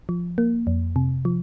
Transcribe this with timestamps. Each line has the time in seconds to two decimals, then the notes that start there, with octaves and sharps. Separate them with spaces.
0.09 F3
0.38 A#3
0.67 F2
0.96 C3
1.25 F3